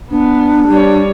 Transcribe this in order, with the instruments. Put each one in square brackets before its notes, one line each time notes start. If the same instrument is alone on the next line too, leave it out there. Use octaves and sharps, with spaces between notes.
[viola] B3 [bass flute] D4
[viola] G3 C#5